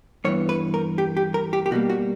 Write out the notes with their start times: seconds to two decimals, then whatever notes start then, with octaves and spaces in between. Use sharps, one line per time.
0.24 G2 E3 B3 C#5
0.49 B4
0.74 A#4
0.98 G4
1.17 G4
1.34 A#4
1.53 G4
1.66 G4
1.71 B2 G3 A#3 F#4
1.90 F#4